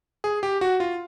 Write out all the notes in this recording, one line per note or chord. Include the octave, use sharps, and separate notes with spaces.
G#4
G4
F#4
F4